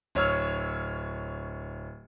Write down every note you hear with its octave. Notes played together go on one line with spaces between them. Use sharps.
D1 C#5 E6 F6